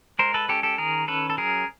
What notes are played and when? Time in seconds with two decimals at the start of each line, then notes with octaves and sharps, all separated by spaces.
0.19 G#3 A#4 C5
0.34 A4 B4
0.48 C#4 G4 A4
0.63 G4 A4
0.78 D#3 G#4 A#4
1.08 C#4 A4 B4
1.30 A4
1.37 F#3 G#4 A#4